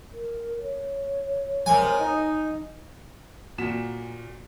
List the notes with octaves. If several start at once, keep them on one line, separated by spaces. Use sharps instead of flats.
A#4
C#5
C3 G#3 A#4 G#5
D#4
A#2 F#4 B6 E7